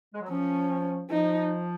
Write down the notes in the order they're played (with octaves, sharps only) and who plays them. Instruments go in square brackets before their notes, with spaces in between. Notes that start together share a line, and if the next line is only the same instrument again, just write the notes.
[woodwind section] G#3
F#3
[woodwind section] F3 [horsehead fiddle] C#4
[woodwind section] F3 [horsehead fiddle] D#4